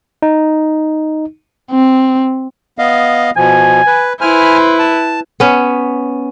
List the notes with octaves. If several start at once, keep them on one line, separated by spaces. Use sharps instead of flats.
D#4
C4
B3 D#5 F5
B2 F3 G#5
B4
E4 B4 C5 G#5 F6
A5
B3 C#4